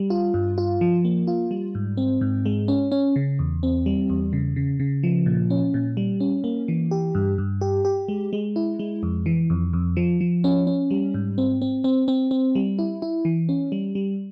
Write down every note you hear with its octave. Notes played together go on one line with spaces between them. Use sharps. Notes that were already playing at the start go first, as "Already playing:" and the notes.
Already playing: G3
F4
G2
F4
F3
A#3
F4
G3
G#2
C4
G#2
G#3
C#4
C#4
C#3
E2
C4
G3
E2
C#3
C#3
C#3
F3
A#2
C#4
A#2
G3
C#4
A#3
E3
G4
G2
G2
G4
G4
G#3
G#3
E4
G#3
F2
E3
F2
F2
F3
F3
C#4
C#4
G3
G#2
C4
C4
C4
C4
C4
G3
E4
E4
E3
C#4
G3
G3